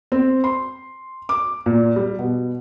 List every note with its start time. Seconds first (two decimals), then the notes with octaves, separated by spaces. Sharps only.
0.12 C4
0.44 C6
1.29 D6
1.66 A#2
1.96 G3
2.19 B2